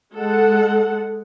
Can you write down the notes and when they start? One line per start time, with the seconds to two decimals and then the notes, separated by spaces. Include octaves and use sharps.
0.14 G#3 A4 F#5